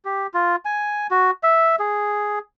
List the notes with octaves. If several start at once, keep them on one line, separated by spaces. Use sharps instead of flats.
G4
F4
G#5
F#4
E5
G#4